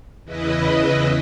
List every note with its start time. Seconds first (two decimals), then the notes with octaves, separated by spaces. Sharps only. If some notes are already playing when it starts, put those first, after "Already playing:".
0.25 E2 C#3 E4 B4 D#5